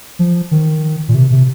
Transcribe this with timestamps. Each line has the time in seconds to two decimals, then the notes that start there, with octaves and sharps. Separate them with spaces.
0.19 F3
0.51 D#3
1.08 A#2
1.15 C3
1.32 C3